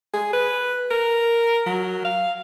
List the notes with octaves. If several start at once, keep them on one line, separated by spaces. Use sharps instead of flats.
G#4
B4
A#4
F#3
F5